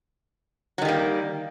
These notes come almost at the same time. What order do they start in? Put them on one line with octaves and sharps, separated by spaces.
F#3 D#3 G3 A#3